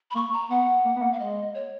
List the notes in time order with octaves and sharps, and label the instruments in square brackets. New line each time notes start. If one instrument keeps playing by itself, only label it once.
[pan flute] B5
[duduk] A#3 [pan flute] C#6
[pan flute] A#5
[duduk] B3 [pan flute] F#5
[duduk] A#3
B3
A#3
[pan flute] F5
[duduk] G#3 [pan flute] D#5
[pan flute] C#5